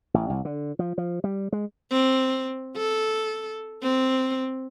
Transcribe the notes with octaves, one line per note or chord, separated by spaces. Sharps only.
A1
C2
D3
F3
F3
G3
G#3
C4
A4
C4